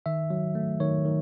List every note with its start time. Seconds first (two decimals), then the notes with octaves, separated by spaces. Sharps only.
0.06 D#3 E5
0.30 F#3
0.55 A3
0.80 D#3 C#5
1.05 D#3